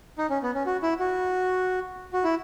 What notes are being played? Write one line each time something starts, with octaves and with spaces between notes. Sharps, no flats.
D#4
C#4
B3
C#4
F#4
E4
F#4
F#4
E4